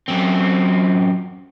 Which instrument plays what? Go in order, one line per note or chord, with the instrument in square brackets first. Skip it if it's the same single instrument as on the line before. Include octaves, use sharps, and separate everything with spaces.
[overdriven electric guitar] F#2 C4